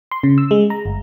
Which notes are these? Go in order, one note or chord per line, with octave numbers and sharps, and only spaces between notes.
C6
C#3
E6
G#3
A#5
G1